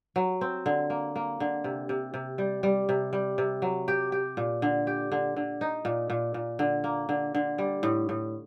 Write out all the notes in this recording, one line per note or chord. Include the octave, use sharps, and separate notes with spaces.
F#3
C4
D3
A#3
A#3
D3
C3
C3
C3
G3
G3
C3
G3
C3
F#3
G4
G4
A#2
D3
G4
D3
D3
D#4
A#2
A#2
A#2
D3
A#3
D3
D3
G3
A2
A2